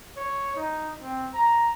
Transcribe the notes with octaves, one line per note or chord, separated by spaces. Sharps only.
C#5
D#4
C4
A#5